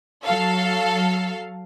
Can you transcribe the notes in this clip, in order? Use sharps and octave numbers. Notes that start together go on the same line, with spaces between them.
F#3 A4 F5